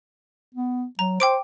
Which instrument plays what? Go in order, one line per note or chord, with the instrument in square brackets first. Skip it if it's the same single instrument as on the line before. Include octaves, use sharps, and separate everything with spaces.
[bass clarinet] B3
[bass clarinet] F#3 [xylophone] A#5
[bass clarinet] C5 [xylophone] G5 D6 D7